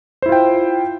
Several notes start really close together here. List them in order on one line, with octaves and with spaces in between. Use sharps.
C5 E4 F4 G5